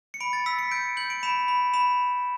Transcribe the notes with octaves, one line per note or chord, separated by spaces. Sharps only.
C#7
B5 D7
A6
E6 B6
C#7
G6 D7
G6 F#7
D7
B5 E7
B5
B5 E7